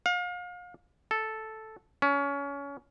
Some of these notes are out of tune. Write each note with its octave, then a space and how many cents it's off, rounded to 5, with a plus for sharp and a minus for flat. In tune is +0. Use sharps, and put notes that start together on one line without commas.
F5 +35
A4 -5
C#4 +25